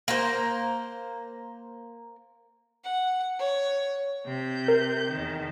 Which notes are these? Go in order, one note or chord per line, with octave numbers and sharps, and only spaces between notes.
A#3 C5
F#5
C#5
C3 G6
A#4
E2 D#3